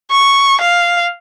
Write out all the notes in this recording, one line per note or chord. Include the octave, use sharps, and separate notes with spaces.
C#6
F5